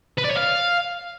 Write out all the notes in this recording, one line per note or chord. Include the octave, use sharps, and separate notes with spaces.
B4
D5
C#5
F5